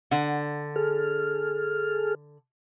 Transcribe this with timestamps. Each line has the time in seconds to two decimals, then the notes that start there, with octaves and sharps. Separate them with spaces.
0.11 D3 F#5
0.76 G#4 A4 F6